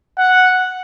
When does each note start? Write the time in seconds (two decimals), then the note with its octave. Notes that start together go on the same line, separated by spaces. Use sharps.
0.18 F#5